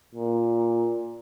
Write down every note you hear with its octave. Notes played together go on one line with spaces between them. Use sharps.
A#2